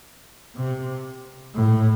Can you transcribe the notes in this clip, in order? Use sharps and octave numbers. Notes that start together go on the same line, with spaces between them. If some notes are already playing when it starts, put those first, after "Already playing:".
C3
A2